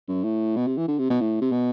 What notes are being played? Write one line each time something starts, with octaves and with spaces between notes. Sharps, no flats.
F#2
A2
B2
C3
E3
D3
C3
B2
A2
C3
B2